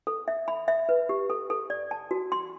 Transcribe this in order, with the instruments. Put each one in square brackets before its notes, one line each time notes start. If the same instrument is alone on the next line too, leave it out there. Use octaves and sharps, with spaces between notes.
[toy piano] A4
E5
B5
E5
B4
G4
A4
A4
D5
A5
F#4
C6